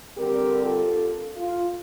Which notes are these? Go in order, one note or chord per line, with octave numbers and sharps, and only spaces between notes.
D3 G3 C4 G4 A#4
F4 A4
F4